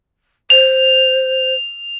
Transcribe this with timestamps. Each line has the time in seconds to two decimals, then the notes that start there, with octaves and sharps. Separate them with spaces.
0.50 C5 F7